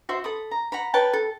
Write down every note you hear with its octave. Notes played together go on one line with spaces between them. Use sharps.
F#4 C5 E5 C6
A4 B5 D#6
A#5
F#5 A#5 B5
B4 C#5 G5 A5
A4